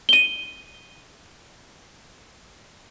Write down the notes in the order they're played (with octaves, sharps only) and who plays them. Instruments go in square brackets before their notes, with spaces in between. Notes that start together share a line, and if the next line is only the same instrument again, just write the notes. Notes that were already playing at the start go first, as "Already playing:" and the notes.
[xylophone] D#7 G7